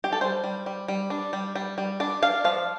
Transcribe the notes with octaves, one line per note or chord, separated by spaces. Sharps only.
G4
A4
G3 C5
G3
G3
G3
D4
G3
G3
G3
D4 D5
D4 F5
F3 F5